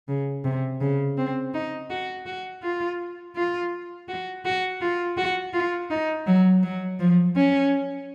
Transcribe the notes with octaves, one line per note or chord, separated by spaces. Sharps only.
C#3
C3
C#3
C4
D#4
F#4
F#4
F4
F4
F#4
F#4
F4
F#4
F4
D#4
F#3
F#3
F3
C#4